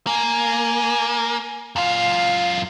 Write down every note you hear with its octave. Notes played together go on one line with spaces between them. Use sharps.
A#3 G#5
F#2 F4 F5